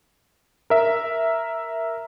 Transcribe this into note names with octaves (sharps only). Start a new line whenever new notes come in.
A#4 E5